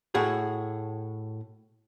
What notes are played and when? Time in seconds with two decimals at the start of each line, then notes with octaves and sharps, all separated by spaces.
0.15 A2 F#4 G#4